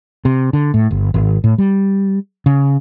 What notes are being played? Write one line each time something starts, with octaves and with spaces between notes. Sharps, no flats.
C3
D3
A2
G1
G#1
A2
G3
C#3